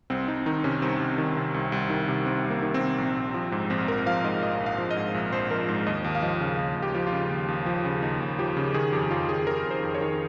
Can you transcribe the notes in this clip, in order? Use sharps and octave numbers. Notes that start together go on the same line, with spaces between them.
C2 C4
C2 D#4
D#3 D#4
C3 C#4
C2 C4
C2
D#3
C3
C2
C2
D#3
C3
C2 C4
C2
A#3
D#3
C4
C3
A#1
A#1
F3
G#2
A#1 C4
A#1 A#4
F3 F5
G#2 D#5
A#1 D#5
A#1
F5
F3
D#5
G#2
A#1
A#1 C5
F3 A#4
G#2
D#2 D#5
D#2
F5
F3 D#5
C#3
D#2
D#2
G4
F3
F4
C#3
D#2
D#2
F3
C#3
D#2 D#4
D#2
F3 G4
C#3
D#3 G#4
F2 G4
F2 F4
D#3 G#4
D#3 A#4
F2
C5
F2
C#5
D#3